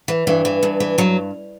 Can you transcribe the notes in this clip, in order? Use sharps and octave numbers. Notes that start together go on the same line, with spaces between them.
E3
G2 E3
E3
G2
E3
G2 F#3